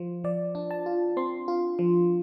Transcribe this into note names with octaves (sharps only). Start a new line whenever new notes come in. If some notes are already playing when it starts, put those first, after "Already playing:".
Already playing: F3 F4 C5
F3 D5
D4
A5
F4
C4 C6
F4
F3